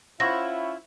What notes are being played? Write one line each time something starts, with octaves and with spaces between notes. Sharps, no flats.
C#4 E4 F4 C5 E5 F#5 C#6 A#6